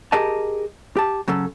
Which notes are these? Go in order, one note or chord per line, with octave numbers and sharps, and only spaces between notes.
G4 G#4 A#4 D#5 A5
G4 A5
C#3 F#3 C#4 A4